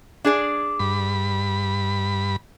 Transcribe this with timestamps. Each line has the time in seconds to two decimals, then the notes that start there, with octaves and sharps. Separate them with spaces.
0.25 D4 G#4 D5
0.80 G2 B5